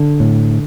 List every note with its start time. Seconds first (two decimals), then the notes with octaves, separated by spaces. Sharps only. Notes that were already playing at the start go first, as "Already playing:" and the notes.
Already playing: D3
0.20 A2